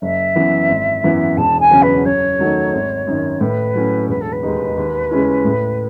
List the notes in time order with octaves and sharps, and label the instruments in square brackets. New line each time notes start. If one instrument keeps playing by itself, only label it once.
[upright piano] F#1 [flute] E5
[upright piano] F#2 E3 B3 E4
G#1
F#2 E3 B3 E4
[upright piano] E1 [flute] A5
[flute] G#5
[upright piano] E2 C#3 F#3 C#4
[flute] B4
[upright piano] F#2 [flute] C#5
[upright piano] D#3 F#3 A3 D#4
G#1
F#2 D#3
[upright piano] A2 [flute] B4
[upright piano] F#3 A3 C#4 E4
[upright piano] E1 [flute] B4
[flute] A4
B4
[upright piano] D#2 D#3 G#3 D#4
D#2
C#3 G#3 C#4 E4
A2